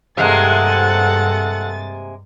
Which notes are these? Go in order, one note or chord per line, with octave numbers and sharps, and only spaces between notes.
G2 C3 G#3 A#3 A4 F#5 A6